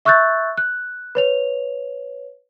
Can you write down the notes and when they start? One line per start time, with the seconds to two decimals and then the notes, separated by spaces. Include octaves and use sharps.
0.05 E5 C#6 E6 F#6 G6 A6
0.57 F#6
1.15 B4 C#5 F7